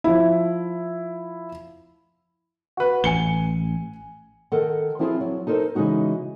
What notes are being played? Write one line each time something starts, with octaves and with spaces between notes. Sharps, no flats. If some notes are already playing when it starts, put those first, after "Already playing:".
F3 E4
F#4 B4
A1 G#5 C#7 G7
D#3 A4 A#4 F#5
F3 C4 E4 F4 G4 G#4
F#3
D#4 A4 A#4 C5
C#3 E3 G#3 D#4 F#4